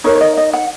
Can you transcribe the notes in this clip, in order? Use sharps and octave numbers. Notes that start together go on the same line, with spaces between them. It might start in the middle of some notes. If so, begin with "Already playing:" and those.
D#4 A#4 C#5
C#5
D#5
D#5
F#5